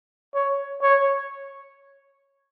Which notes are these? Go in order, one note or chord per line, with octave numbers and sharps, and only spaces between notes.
C#5
C#5